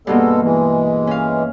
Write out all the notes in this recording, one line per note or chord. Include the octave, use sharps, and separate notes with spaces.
G2 B2 G#3 A#3 B3 A4
E3 G#3
C#4 F5